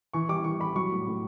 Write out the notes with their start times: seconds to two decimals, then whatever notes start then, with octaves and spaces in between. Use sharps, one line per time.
0.13 E3 C#6
0.29 G3 D6
0.44 E3 C#6
0.60 G3 B5
0.76 F#3 C#6
0.92 A2
1.07 A2